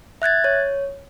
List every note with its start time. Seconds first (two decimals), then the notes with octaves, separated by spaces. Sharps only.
0.22 E5 F#6 G#6 A6
0.44 C#5